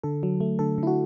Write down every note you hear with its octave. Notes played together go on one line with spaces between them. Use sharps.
D3 A4
F#3
A3
D3 A4
D3 E4
F#4